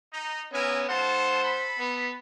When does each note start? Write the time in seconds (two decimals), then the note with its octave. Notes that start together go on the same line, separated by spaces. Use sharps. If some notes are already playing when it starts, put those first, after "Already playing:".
0.12 D#4
0.53 B3 C#4 A#4 E5 G#5
0.89 A4 C5 F5 F#5 A5
1.43 A4 B5
1.79 B3